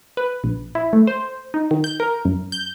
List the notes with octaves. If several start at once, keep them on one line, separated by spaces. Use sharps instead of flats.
B4
A#1
E4
A3
C5
D#4
D#3
G6
A#4
F#2
G6